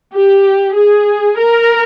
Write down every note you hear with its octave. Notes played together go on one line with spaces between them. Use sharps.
G4
G#4
A#4